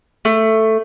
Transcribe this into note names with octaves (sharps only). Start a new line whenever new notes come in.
A3